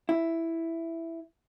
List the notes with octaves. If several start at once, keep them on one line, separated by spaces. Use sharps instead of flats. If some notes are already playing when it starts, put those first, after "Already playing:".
E4